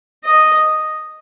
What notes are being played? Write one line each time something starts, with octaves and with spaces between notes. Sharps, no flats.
D#5